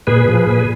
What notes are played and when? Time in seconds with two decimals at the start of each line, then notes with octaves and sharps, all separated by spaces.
0.07 A#2 G#4 B4
0.28 F3
0.47 A#2